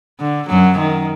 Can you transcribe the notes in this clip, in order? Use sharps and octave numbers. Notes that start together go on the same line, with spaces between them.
D3
F#2 F#3
D#3